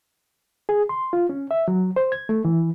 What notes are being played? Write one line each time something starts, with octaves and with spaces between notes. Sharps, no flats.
G#4
C6
F4
C#4
E5
F#3
C5
G#6
A3
E3